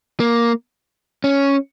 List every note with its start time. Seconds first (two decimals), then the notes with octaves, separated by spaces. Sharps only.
0.20 A#3
1.24 C#4